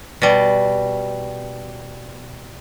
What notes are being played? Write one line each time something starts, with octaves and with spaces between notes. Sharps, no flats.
B2 G3